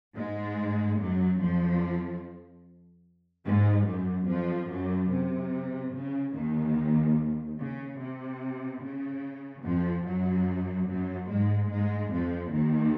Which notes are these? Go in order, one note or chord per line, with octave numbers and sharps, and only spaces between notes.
G#2 G#3
F#2 F#3
F2 F3
G#2 G#3
F#2 F#3
F2 F3
F#2 F#3
C3
C#3
D#2 D#3
C#3
C3
C#3
F2 F3
F#2 F#3
F#2 F#3
G#2 G#3
G#2 G#3
F2 F3
D#2 D#3